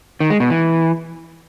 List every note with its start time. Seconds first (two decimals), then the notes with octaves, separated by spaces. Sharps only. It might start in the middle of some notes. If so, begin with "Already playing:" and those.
0.20 D#3
0.30 G#3
0.40 B2
0.50 E3